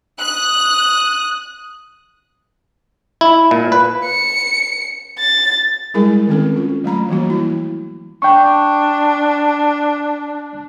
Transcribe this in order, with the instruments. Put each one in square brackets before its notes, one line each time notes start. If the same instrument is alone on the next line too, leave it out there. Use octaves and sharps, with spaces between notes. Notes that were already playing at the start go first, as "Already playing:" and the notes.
[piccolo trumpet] D#6 [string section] F#6
[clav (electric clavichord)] E4
A#2
B4
[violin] C#7
A6
[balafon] G3 G#3 E4 G#4 A#4 G#5
D#3 C4 C#4 A4
F4
F#3 A3 A#5 B5
E3 G3 A#3 F#4
E4
[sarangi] D4 [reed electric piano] G5 C#6